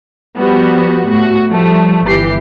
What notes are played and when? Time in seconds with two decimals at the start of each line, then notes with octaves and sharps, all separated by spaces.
0.38 F3 G3 B3 F#4
1.08 A2 F#4
1.50 F3 G3 A3
2.06 G1 E3 G4 C7